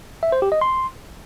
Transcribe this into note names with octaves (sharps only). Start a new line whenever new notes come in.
E5
C5
G4
D#5
C6